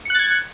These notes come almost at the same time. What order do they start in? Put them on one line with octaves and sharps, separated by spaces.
C#7 F#6 A6 G#6